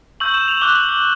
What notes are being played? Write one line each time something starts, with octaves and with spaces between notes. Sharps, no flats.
C#6 E6 G6 F#7
E7
F7
D6 F#6 G7
F#7
F#7